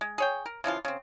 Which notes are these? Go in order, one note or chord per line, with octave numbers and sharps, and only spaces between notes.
G#3
G#4 C#5 G5
A#4
C#3 E3 F3 F4
C#3 C4